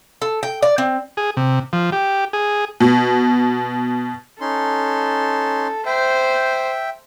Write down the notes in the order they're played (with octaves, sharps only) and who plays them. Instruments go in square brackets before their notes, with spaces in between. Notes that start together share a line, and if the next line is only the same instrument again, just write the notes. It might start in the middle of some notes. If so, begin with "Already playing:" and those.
[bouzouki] A4
G5
D5
C4
[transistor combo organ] G#4
C3
F3
G4
G#4
[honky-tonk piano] B2
[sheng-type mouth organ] C#4 D#4 C6 [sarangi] A4
[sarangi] C5 [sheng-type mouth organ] E5 G5